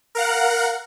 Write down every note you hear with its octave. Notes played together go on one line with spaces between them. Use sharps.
A#4 F5 F#5